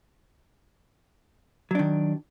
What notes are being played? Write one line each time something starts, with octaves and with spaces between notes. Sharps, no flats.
D#3 F#3 D4